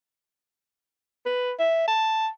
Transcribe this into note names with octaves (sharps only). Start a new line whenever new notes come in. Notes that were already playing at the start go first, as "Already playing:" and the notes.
B4
E5
A5